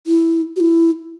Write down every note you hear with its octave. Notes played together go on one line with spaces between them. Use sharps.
E4
F#4
E4